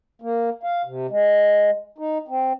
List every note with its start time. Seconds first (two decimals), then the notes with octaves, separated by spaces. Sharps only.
0.22 A#3
0.63 F5
0.85 C3
1.10 G#3
1.98 D#4
2.28 C4